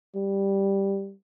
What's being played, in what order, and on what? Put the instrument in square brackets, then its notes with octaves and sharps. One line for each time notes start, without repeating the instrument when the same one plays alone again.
[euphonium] G3